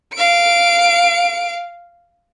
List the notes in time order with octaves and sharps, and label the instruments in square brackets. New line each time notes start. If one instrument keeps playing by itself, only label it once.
[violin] F5 D7